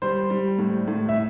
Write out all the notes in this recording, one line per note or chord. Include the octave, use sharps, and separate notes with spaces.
G3 C5
G3
A2
A2
E5